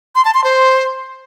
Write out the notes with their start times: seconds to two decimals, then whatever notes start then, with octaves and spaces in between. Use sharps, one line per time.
0.15 C6
0.25 A5
0.34 C6
0.44 C5